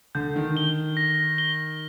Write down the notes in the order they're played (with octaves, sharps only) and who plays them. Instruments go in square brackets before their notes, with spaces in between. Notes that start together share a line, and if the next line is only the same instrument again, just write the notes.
[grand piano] D3 [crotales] G6
[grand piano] D#3
[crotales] G7
A#6
G7